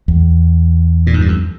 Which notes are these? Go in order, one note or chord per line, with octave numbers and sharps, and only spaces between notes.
E2
A#2
G#2
G2
F2